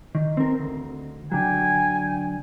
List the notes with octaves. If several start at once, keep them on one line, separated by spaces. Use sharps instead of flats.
D#3
C4 A#4
D2
D3 F#3 G5 G#5